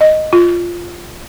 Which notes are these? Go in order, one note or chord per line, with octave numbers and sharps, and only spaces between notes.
D#5
F4